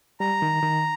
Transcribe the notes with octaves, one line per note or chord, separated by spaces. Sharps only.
G3 A#5
D#3
D#3